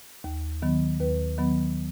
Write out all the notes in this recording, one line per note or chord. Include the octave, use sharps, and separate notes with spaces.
D#2
D#3 F#3 B3
D#2 B4
D#3 F#3 B3